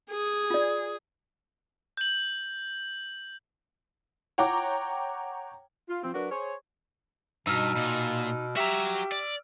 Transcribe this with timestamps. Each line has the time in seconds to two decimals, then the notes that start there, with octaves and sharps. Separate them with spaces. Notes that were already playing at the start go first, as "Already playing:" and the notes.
0.11 G#4
0.50 F4 D5
1.97 G6 F#7
4.38 C#5 F#5 G5 A#5 D6
5.88 F4
6.03 F3 C4
6.14 F#3 D4 F#4 A#4 B4
6.30 G#4 C5 C#5
7.47 G2 B2 D#4 E6 F6
7.77 A#2
8.57 F#4 G4 E5 A#5
9.12 D5